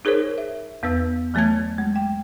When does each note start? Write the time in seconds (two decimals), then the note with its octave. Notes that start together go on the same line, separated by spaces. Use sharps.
0.05 D#4 G#4 A#4 C5 C#5
0.38 E5
0.83 E2 B3 B4 E6
1.34 E3 F#3 A3 C#5 A5 G#6
1.78 G#3
1.96 G5